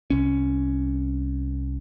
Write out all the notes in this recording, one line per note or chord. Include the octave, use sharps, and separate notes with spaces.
C2 C#4